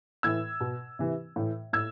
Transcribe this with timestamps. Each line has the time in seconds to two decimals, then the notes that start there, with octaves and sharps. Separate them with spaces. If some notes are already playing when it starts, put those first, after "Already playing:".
0.23 A2 E3 E6 G#6
0.60 B2
0.99 C3 E3
1.36 A2 E3
1.73 A2 E6 G#6